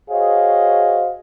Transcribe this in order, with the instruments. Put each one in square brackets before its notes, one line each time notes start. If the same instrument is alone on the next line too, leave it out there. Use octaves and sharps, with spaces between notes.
[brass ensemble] F#4 G#4 C5 C#5 D#5 F5